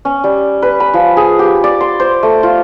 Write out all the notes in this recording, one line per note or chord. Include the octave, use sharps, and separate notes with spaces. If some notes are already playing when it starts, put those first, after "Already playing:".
C#4
G3
B4
B5
F3
G#4
G4
D5
C6
C5
A3
F4